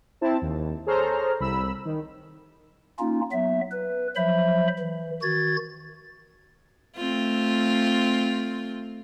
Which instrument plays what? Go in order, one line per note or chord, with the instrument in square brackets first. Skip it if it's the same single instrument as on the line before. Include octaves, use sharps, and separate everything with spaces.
[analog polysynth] C4 E4 A5
D#2
G#4 A4 C5 C#5 A#5 F6
C2 B5 E6
D#3
[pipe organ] A#3 C#4 D#4 F4
F#3 B3 E5
B4
F3 F#3 C5 E5 B5
E3
D#3 F#4 G#6 A6
[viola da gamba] A3 C4 F4